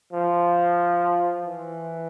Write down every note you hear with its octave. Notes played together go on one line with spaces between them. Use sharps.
F3
E3